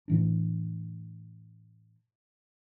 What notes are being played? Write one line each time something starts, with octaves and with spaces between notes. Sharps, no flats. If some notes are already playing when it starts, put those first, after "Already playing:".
A2 E3 D4